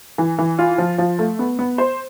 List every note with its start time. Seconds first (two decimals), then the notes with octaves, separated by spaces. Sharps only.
0.18 E3
0.39 E3
0.59 F4
0.78 F3
0.98 F3
1.19 A3
1.39 B3
1.59 B3
1.78 C5